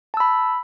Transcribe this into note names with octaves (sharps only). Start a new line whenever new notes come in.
A5 B5 E6